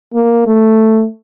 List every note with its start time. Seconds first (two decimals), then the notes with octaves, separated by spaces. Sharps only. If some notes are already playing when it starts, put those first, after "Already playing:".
0.14 A#3
0.47 A3